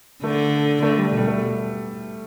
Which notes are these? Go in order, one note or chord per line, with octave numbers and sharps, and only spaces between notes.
D3 A3
D3 A3
G3
B2 G3
A3